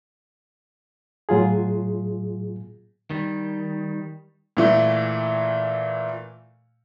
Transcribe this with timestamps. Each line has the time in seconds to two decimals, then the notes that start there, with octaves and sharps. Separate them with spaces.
1.29 A2 F#3 F4 G#4
3.10 D#3 G3
4.57 A#2 E3 A3